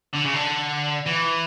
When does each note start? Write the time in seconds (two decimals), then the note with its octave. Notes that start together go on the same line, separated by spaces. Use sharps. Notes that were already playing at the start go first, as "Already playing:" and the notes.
0.15 D3
0.25 C#3
0.35 D3
1.06 E3